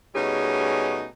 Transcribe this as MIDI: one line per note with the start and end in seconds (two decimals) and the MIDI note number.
0.15 1.06 47
0.15 1.06 55
0.15 1.06 57
0.15 1.06 61
0.15 1.06 63
0.15 1.06 68